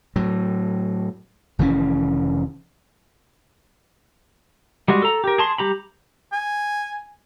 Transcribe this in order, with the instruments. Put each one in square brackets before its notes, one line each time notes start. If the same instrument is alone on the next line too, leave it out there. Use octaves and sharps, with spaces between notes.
[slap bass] A2 F#3
F1 D#3 E3 C#4
[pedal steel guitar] G3 G#3 F#4
A4 A#5
G4 A#4
G#4 A5 C6
G3 G4 A#5 B5
[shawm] G#5